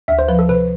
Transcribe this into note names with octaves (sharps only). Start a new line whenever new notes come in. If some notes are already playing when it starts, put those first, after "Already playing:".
D2 E5
C5
F3 B4
A4
C3 B4